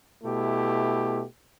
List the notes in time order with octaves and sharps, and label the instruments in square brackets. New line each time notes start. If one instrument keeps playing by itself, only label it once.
[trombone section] B2 A3 E4 G4